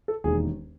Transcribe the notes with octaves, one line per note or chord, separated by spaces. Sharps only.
A4
E1 D#2 D#3 G#4